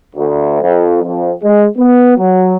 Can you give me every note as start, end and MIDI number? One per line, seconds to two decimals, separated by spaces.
0.15 0.60 38
0.62 1.00 41
1.02 1.31 41
1.43 1.65 56
1.78 2.13 59
2.18 2.56 54